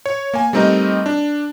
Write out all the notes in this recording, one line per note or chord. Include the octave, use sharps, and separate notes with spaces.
C#5
A#3 G#5
G3 A3 C4 D#4 A#4 D#5
D4